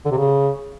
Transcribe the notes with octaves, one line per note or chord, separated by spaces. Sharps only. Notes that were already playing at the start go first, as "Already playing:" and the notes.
D3
C3
C#3